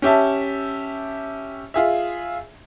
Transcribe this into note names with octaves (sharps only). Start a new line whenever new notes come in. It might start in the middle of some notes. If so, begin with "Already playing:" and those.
C#4 G4 E5 A5
F4 G#4 E5